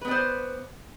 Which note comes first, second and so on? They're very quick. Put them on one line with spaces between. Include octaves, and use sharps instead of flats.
B4 B3 D5 C5